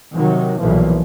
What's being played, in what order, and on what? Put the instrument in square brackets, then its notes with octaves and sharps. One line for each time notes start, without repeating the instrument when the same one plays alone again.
[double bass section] C3 D#3 F#3
B1 A#2 E3 F3